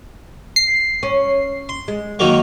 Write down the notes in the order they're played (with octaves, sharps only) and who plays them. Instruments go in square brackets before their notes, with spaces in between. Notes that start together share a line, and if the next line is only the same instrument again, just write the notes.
[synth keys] C7
[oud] C#4
[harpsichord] C6
[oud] G#3
[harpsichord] D#3 F#3 A#3